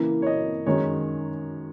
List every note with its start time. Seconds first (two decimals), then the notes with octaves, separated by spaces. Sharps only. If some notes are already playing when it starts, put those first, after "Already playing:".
Already playing: C#3 E3 A#3 E4
0.22 C#5
0.27 D#5
0.66 F#2 D#3 G#3 D#4 C#5